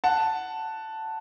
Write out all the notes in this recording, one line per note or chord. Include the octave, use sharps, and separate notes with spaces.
F#5 A5